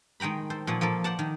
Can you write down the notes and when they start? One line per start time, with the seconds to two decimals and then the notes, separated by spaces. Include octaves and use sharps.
0.20 D#3 G#3 G5 A#5 B5
0.50 A4 C5
0.67 A#2 F3 C#5 F#5
0.81 F3 A#3 A4 A#4
1.04 C5 D5 F#5 A5
1.19 D#3